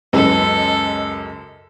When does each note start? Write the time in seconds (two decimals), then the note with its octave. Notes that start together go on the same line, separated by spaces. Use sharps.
0.13 C#2 F#2 G#3 C#4 A4 B4